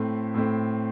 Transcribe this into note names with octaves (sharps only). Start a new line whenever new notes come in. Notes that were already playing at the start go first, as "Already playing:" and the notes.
Already playing: A2 A3 C4
A2 A3 C4